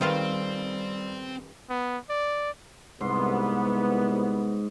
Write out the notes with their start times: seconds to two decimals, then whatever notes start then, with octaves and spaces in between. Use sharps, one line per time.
0.01 D#1 D#3 G3 C4 F4 B4 F5
1.70 B3
2.10 D5
3.01 C2 G#2 B3 C6